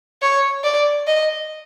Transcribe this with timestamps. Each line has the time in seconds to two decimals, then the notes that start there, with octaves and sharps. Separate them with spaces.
0.22 C#5
0.64 D5
1.07 D#5